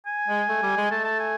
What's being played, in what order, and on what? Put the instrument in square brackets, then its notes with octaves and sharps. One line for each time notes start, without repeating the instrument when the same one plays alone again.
[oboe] G#5
[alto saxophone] G#3
A3
G3
G#3
[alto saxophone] A3 [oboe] A5
[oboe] A5
G#5